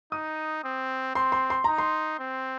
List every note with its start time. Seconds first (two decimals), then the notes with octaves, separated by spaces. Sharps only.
0.12 D#4 D#6
0.64 C4
1.15 C4 C6
1.32 C6
1.50 C6
1.64 D#4 A#5
1.78 C6
2.19 C4